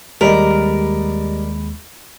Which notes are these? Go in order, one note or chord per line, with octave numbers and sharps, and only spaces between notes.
D#2 G3 G#3 A#4 D5 D#5 B5